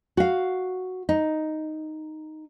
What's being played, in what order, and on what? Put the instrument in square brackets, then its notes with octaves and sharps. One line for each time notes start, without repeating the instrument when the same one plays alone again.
[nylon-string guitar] F#4 F5
D#4